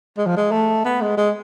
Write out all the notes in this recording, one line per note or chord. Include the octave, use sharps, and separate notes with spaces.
G#3
F3
G#3
A3
B3
G#3
G#3